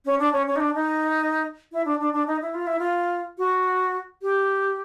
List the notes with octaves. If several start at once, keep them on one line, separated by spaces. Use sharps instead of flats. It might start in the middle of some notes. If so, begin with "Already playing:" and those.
C#4
D4
C#4
C#4
D#4
D4
D#4
E4
D4
D4
D4
D#4
E4
F4
E4
F4
F#4
G4